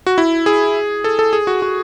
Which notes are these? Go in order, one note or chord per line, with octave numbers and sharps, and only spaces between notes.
F#4
E4
G#4
A4
A4
G#4
F#4
F#4